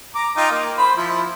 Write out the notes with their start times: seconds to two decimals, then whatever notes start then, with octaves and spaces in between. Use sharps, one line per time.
0.15 A#5 D6
0.37 D#4 F4 G5
0.51 A#3
0.78 C5 B5
0.97 F3 E4